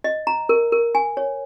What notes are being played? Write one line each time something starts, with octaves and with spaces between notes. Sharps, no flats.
D#5
A#5
A#4
A#4
G#5
C#5